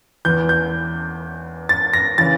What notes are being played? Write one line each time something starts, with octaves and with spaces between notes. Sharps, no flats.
E2 E3 G6
G6
A6
A#6
C#3 E3 A6